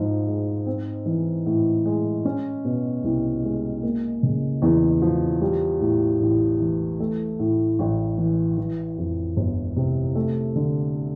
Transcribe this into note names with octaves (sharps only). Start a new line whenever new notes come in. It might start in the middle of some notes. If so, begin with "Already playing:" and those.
Already playing: G#2 F3
G#3
C4
E3
A2
G#3
C#4
B2
C2
G#3
A#3
C#3
E2
F3
G3
A2
A1
E3
A3
A2
A1
E3
E3
F2
G1
C3
A3
D3